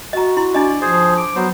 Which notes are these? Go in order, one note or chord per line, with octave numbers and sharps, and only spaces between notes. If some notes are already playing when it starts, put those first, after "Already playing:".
F#4 D#5 A#5
E4 C6
D4 E4 D5 D#5
F3 G#4 C5
D6
F#3 B3 C5